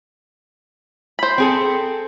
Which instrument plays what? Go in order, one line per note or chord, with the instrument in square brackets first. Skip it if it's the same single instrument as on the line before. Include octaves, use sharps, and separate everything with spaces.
[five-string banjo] C5 B5
[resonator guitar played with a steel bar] C4 G#4 A4